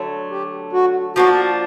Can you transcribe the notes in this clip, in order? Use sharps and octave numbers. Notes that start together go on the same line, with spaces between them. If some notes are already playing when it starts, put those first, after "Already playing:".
Already playing: D3 F#3 A3
G4
F#4
F3 A#3 D4 F#4